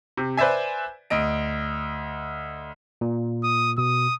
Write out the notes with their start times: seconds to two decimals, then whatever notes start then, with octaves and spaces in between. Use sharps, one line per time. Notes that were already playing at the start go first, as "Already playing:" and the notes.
0.17 C3
0.37 B4 C5 D5 E5 G#5
1.10 D2 D#5 D7
3.01 A#2
3.43 D#6
3.78 B2 D#6